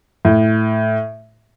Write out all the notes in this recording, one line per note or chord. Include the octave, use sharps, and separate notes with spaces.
A2